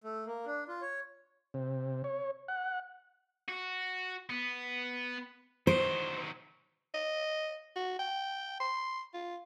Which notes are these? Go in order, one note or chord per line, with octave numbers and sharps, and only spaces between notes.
A3
A#3
D4
F4
C#5
C3
C#5
F#5
F#4
B3
D#3 F#3 C5
D#5
F#4
G5
C6
F4